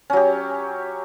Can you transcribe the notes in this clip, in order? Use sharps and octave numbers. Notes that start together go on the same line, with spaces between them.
F#3 C#4 G4